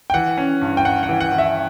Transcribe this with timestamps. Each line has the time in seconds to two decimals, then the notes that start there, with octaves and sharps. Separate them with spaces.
0.10 G5
0.14 E3 F#5
0.38 C#4
0.62 G2
0.77 G5
0.85 G2 F#5
1.03 F#5
1.09 E3
1.21 F#5
1.32 E3
1.38 E5